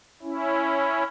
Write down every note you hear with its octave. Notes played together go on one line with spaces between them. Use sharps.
C#4 E4